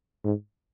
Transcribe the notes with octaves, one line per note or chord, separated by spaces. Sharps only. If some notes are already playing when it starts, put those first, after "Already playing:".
G#2